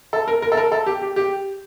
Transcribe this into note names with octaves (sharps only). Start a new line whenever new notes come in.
A4
A#4
A#4
A4
A#4
A4
G4
G4
G4